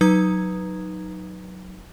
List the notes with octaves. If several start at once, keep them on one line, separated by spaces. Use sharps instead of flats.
F#3 D#4 B4 A#5 D#6 G#6